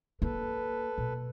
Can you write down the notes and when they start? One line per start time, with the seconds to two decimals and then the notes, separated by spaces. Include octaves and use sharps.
0.22 A#3 A4 B4
0.98 B2